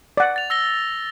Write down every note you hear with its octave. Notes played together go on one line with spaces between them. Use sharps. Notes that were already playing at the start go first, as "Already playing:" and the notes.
D5 F#5
A6 F7
E6 A#6 G7